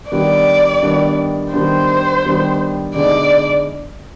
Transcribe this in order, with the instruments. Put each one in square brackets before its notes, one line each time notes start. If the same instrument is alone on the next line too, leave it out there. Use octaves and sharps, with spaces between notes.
[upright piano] D#3 G3 B3 D4 [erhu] D5
[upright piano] D#3 G3 B3 D4
[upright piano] D#3 G3 B3 D4 [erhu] C5
[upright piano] D#3 G3 B3 D4
[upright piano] D3 G#3 B3 D#4 [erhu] D5